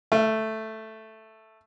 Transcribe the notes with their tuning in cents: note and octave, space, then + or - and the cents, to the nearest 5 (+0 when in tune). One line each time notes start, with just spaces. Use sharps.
A3 +0 F5 -40